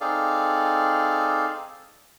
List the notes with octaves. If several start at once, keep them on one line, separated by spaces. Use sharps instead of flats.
C4 D#4 G#4 A4 D5 F5